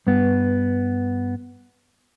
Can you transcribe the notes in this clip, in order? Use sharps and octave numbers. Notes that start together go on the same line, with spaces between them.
G2 B3